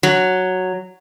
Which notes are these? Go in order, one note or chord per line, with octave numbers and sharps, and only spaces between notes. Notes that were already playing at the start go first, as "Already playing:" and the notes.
F#3